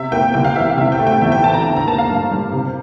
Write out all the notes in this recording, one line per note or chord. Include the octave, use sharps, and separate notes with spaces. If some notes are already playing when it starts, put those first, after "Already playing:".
Already playing: C3 E5
A#3 G5
C2 G5
F5
E3 E5
F5
C3 E5
G5
A3
G5
E2 E5
G5
E3 A5
A#5
D3
A#5
A#3 A5
F5
G2
G3
C3